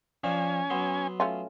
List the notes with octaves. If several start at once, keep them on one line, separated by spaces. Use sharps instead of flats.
F3 C#4 D4 F5 G#5
F#3 B3 C6
A3 C#4 F4